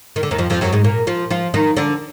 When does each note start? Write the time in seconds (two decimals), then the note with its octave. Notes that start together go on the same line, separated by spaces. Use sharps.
0.16 D#3
0.23 D3
0.31 D#2 D#3
0.38 F2 F3
0.50 F2 F3
0.61 F#2 F#3
0.73 G#2 G#3
0.84 A#2 A#3
1.07 F3 F4
1.30 F3 F4
1.54 D#3 D#4
1.77 D3 D4